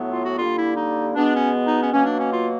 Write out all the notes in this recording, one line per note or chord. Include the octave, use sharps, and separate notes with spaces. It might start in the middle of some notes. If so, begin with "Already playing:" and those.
Already playing: A2 F#3 B3
F4
F#4
D3 G3 A#3 F4
E4
D#4
B2 G#3 B3 D4
C#4
D#4
C#4
B2 F#3 A#3 C#4
D4
C#4
F4